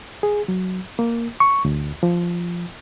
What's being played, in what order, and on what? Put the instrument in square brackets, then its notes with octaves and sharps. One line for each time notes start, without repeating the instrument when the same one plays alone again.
[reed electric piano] G#4
F#3
A#3
C#6
D2
F3